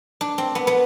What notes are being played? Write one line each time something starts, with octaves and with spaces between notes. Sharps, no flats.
D4
C4
B3
B3